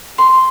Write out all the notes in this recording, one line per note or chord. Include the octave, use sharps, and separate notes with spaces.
C6